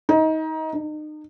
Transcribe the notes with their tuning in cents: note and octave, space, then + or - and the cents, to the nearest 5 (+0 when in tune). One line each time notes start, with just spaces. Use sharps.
D#4 +25
D#4 -35